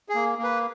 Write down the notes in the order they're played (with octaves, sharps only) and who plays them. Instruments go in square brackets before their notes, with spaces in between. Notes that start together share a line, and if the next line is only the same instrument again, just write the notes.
[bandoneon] G#4
A#3
A#3 B4